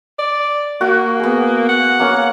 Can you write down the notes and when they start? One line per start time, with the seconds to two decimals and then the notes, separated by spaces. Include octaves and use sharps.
0.19 D5
0.81 A#3 F#4
1.20 B3 G#4
1.69 F#5
1.99 A#3 C#4 F5